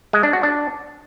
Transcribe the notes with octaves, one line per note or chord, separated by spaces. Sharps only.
G#3
D4
F#4
D4